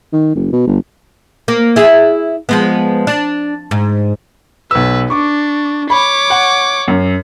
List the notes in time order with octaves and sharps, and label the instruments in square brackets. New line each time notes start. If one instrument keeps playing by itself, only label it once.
[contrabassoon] D#3
F#1
B2
G1
[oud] A#3
E4 G#4
F3 G#3 B3
D4
G#2
[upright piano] B1 E6 [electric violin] B4
[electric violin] D4 [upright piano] C#6 D6
[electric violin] C#5 D6 [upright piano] B5
[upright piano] F#5
F#2